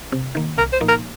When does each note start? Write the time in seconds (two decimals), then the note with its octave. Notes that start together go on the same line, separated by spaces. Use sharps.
0.12 C3
0.35 D#3 A#3
0.58 C2 A#4
0.73 C5
0.80 A#2 F3 A#3 D#4
0.89 A#4